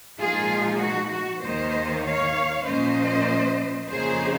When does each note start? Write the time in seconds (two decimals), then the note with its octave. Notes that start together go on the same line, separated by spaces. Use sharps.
0.19 A#2 F3 G#3 D#4 F4 G#4
0.80 F#4
1.12 F#4
1.42 D#2 D#3 A#3 D#4 C5 D#5
2.04 C#5 F5
2.66 A#2 F3 A#3 C#4 C5 D#5
3.89 F2 C#3 F3 A#3 D#4 G#4 C5